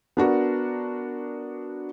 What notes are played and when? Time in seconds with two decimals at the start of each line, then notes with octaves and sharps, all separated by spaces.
0.17 B3 D4 F#4 A#4